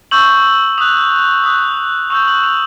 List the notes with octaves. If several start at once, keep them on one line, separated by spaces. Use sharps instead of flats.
C#6 E6 G6 F#7
D#6 F#6 F7
D#6 F#6
C#6 E6 G6 F7
F#7
F7